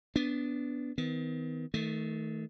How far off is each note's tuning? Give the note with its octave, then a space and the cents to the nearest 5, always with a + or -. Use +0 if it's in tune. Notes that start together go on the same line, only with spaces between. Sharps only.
B3 +0 D4 -15
D#3 +35 B3 +35
D#3 +30 A3 +0